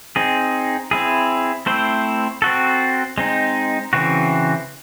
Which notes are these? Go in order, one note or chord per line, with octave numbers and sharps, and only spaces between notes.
C4 D#4 G#4
C4 E4 G#4
A3 C4 E4 C5
C4 F#4 A4
G#3 C4 D#4
C#3 E3 C4 F#4